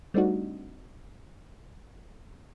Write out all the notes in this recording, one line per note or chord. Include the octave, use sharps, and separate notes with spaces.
G3 A3 C4 D4 D#4 F#4